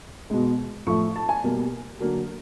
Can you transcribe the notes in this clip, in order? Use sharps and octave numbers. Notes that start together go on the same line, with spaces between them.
B2 G#3
A2 F3 A3 C#6
A5
G#5
B2 G3 A#3
D3 F#3 A#3